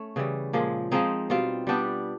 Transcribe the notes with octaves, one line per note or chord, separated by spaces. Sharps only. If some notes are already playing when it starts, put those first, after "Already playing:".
Already playing: A3 C#4
C#3 E3 G3
A#2 F3 G#3
F3 G#3 C4 D#4
B2 G3 C4 F4
G3 B3 D4 G4